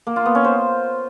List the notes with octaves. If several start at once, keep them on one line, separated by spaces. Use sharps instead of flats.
A#3
F4
B3
C#4
C5